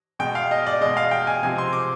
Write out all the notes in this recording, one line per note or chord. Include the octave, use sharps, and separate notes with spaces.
B2 G#3 G5
F5
D#5
D5
B2 G#3 D#5
F5
G5
G#5
C3 F3 G#3 G#5
C6
D6